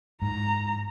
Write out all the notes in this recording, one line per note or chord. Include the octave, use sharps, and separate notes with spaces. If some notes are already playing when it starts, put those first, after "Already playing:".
G#2 A#5